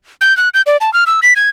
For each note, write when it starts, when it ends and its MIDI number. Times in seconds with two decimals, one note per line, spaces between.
0.21 0.36 91
0.37 0.49 90
0.54 0.62 91
0.66 0.77 74
0.81 0.92 81
0.94 1.04 89
1.07 1.20 88
1.23 1.34 95
1.36 1.49 92